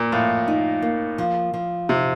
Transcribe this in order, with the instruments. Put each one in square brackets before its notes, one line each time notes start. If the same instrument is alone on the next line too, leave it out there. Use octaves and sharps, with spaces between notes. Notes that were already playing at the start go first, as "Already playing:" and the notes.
Already playing: [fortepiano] A#2 [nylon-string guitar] A#3
[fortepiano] A2 [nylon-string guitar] F3
[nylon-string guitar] D#4
A#3
F3
F3
[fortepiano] C3 [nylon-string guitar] D#4